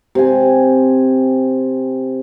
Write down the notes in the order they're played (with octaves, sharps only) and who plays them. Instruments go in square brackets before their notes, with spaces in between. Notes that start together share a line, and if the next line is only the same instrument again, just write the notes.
[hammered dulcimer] C3 G#5